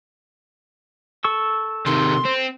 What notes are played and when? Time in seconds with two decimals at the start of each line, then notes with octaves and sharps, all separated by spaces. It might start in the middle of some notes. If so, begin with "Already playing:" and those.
1.24 A4 C#6 E6
1.86 C3 D#3 C6
2.25 C4